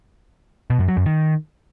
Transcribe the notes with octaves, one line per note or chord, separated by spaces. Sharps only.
B2
F#2
F#3
F#2
D#3